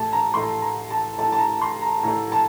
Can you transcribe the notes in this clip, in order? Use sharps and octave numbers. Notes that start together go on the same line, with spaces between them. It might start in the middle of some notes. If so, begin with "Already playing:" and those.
Already playing: A2 A3 A5
A#5
A2 A3 C6
A#5
A5
A2 A3 A5
A5
A#5
C6
A#5
A2 A#5
A3
A5